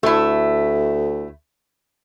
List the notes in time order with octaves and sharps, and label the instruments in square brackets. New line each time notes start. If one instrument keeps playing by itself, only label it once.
[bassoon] D2 [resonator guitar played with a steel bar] A3 E4